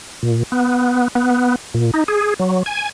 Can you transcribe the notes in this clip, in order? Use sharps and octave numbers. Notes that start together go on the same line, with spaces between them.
A#2
B3
B3
A#2
D#4
G#4
F#3
G#5